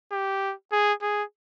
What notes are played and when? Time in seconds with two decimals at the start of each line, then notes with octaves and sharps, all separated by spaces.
0.12 G4
0.72 G#4
1.02 G#4